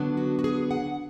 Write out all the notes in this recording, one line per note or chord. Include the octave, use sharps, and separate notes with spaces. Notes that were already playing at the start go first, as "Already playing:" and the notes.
Already playing: D3 F#3 B3 D4
F#4
F#4
G#4
F#5